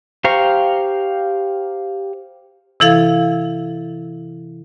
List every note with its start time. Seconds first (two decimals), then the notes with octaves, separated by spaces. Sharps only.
0.24 G4 C5 F5 A#5 C#6
2.80 C3 E3 E4 A4 F5 G#6